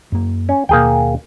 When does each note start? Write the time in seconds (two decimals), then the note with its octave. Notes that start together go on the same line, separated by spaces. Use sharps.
0.12 F#2 A#3
0.49 C#4
0.69 D#2 B2 A#3 G#4 G5